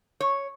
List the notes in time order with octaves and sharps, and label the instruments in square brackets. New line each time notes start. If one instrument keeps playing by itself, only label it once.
[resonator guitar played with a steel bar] C#5